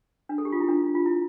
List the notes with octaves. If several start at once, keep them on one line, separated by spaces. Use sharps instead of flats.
D4
A4
G4
F4
E4
D4
F4
E4